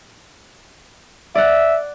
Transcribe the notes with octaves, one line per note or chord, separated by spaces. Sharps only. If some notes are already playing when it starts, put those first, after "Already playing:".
D5 E5 F#5